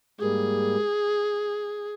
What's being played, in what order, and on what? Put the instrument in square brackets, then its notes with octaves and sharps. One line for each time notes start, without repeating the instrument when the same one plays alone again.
[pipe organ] G#2 G3 A#3 [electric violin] G#4